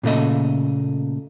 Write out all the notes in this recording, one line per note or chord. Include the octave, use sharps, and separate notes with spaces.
A#2 C#3 A3 D#5